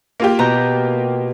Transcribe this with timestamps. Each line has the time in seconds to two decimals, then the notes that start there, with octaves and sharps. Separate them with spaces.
0.20 A#3 F4 G4
0.39 B2 A#5 G6